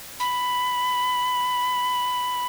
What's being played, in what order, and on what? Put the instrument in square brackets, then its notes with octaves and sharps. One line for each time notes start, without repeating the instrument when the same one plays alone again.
[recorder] B5